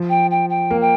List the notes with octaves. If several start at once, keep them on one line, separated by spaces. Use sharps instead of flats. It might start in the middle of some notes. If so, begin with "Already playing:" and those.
Already playing: F3
G5
G5
G5
A#3
G5